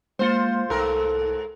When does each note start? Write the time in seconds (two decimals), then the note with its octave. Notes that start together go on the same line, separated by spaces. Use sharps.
0.19 G#3 A#3 F4 C5 C#7
0.70 C2 G#2 A4 A#4